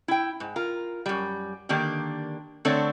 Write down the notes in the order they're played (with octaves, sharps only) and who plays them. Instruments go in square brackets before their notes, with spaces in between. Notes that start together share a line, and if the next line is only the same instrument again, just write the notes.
[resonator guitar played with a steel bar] E4 G5
G#2
F4 A#4
F#2 G3
D3 D#3 A#3 D4 G4
D3 A3 C4 D4 A4 C#5